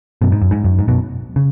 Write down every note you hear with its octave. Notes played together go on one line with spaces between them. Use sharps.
F#2 B2
G#2
F#2
G#2
F#2
G#2
F#2 B2
C#3